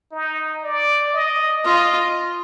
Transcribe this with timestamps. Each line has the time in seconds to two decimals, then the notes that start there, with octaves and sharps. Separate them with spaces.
0.12 D#4
0.64 D5
1.14 D#5
1.64 F4 D#5